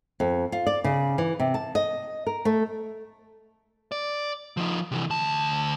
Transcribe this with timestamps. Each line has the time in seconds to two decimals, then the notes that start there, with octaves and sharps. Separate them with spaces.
0.20 F2
0.52 F4
0.67 D5
0.84 C#3
1.18 E3
1.40 C3
1.54 A5
1.75 D#5
2.27 A#4
2.45 A3
3.92 D5
4.57 F3 D#4
4.92 C3 E3
5.10 D2 A5